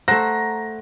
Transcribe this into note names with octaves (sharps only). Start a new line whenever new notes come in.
A3 C5 F#5 A#5 A#6